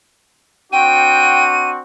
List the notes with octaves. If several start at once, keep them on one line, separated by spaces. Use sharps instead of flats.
C4 D4 F#4 G5 D#7